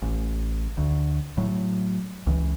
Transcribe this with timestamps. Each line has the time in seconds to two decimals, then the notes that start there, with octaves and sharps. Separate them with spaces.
0.02 A1
0.78 D2
1.37 A2 F#3
2.27 C#2 E3